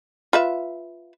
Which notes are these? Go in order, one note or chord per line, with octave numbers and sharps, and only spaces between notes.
F4 B4 E5